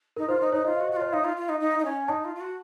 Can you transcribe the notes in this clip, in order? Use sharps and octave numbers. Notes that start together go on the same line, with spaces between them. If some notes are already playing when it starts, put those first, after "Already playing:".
D#4 A#4
F4 C5
D#4 C5
D#4 C#5
F4 D#5
F5
F#4
D#5
F#4
F4 C#5
D#4 F5
F4
F4
D#4
D#4
D#4
C#4
D#4 A5
F4
F4
F#4